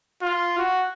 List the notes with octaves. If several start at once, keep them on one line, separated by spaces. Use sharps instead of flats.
F4
F#4